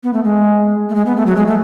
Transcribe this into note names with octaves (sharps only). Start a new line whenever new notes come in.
B3
A3
G#3
A3
G#3
B3
A3
F#3
G#3
A3